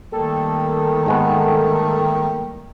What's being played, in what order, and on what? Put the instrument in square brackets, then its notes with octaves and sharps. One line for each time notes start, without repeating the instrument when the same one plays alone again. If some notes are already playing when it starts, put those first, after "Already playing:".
[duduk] D#3 [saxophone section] G3 A3 A#3 [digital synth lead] A4
[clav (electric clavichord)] G#2 G#3 B3